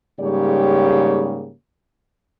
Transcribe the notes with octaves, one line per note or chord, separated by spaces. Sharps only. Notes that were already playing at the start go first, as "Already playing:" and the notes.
G#2 C#3 G3 A#3 G4 C#5